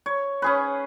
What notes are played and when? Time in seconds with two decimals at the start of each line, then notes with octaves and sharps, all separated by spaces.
0.06 C#5
0.42 C#4 G#4 B4